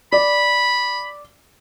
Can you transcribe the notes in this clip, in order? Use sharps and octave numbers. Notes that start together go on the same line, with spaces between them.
D5 B5